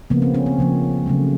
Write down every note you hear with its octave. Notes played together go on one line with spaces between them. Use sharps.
C#3 F3 A#3 B3
C4
C#4
C4
C#3 F3 A#3
C#3 F#3 A3